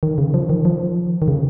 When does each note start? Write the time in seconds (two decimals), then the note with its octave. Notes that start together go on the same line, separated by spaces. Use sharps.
0.03 D#3
0.18 C#3
0.34 F3
0.50 D#3
0.65 F3
1.22 D#3
1.28 C#3